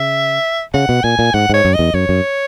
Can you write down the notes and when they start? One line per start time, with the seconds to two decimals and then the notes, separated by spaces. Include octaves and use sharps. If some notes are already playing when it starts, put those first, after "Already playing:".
Already playing: C#3 E5
0.74 C#3 F#5
0.89 B2
1.04 A#2 G#5
1.19 A#2
1.34 G#2 F#5
1.50 G#2 C#5
1.65 F#2
1.74 D#5
1.79 E2
1.94 F#2 C#5
2.09 F#2